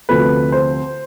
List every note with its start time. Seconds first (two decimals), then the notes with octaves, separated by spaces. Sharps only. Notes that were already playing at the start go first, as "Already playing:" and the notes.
0.09 D2 C3 F3 A3 B4
0.52 C5